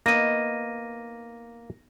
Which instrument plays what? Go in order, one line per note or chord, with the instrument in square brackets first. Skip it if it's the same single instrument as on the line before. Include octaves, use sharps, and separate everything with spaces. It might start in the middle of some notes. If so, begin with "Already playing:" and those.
[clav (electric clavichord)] A#3 [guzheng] B3 D#4 [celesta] A#6 D#7